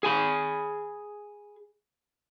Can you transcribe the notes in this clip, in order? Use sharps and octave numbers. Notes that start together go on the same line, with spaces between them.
G#4 G#5 B5